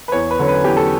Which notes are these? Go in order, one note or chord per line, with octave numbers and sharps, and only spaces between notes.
B4
E2 C#5
B4
D3 F#3 C#4
B4
E2 G4
A4